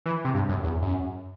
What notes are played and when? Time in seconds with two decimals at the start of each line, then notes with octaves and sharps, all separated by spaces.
0.06 E3
0.25 C3
0.34 G2
0.49 F#2
0.64 E2
0.82 F#2